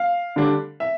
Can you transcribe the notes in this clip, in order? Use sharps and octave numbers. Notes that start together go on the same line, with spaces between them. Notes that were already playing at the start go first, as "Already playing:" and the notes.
Already playing: F5
D3 G3 D4
E5